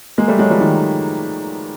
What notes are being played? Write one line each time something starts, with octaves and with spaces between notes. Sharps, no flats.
G#3 A#3
G3 A3
F#3 G#3
F3 G3
D#3 F3